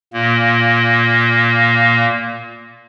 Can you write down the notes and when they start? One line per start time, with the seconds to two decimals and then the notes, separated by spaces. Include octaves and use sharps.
0.13 A#2 A#3